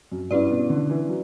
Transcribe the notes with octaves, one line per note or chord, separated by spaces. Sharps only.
F#2
G2 C#4 E4 B4 D5
B2
D3
E3
F#3